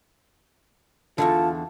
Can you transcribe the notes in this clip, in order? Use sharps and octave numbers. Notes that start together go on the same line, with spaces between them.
E2 G#2 D3 F4 A5